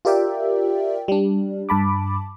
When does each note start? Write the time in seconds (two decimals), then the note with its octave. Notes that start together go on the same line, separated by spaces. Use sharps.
0.05 F4 G4 A#4 D5 E5 G5
1.08 G3 D4
1.69 G2 A5 B5 D6